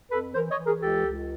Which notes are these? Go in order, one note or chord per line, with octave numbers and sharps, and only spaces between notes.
F2 A4 B4
E3 A#4 C5
C#5 D#5
E3
G#4 A#4
C#2 G4 A4
C#2